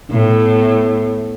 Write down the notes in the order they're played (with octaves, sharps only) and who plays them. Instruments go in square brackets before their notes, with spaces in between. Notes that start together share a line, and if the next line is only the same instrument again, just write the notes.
[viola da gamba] A2 B3